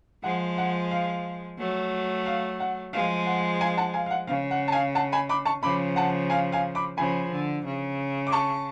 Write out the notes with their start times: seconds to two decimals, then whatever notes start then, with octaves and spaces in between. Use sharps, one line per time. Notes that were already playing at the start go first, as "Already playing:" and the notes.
0.23 F3 G#3 F#5
0.58 F#5
0.91 F5
1.58 F#3 A3
2.26 F5
2.60 F#5
2.93 F3 G#3 F5
3.27 F#5
3.61 F5 G#5
3.77 F#5 A5
3.94 F5 G#5
4.06 F5
4.11 F#5
4.27 C#3 F5
4.51 F#5
4.68 A5
4.72 F5 G#5
4.95 F#5 A5
5.12 G#5 B5
5.29 B5 D6
5.45 A5 C#6
5.63 C#3 F3 B5 D6
5.96 F#5 A5
6.30 F5 G#5
6.52 F5 G#5
6.75 B5 D6
6.97 C#3 F3 G#5 B5
7.32 D3
7.65 C#3
8.27 D6
8.32 A5 C#6